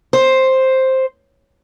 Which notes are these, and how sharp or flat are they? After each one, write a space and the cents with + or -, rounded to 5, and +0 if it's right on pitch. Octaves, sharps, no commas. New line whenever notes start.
C5 +5